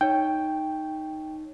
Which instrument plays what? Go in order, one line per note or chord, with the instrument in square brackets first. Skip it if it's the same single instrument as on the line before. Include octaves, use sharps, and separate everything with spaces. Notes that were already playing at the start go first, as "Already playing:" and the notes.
[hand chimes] D#4 C#5 [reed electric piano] G5